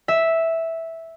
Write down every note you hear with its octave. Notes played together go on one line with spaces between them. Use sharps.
E5